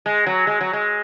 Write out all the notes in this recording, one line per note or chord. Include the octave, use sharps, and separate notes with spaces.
G#3
F#3
G#3
F#3
G#3